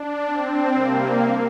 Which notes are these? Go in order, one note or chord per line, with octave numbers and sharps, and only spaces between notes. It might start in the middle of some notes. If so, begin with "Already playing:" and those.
Already playing: D4
C4
C3 G3 A#3